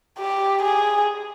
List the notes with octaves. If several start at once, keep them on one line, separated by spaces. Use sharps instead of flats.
G4
G#4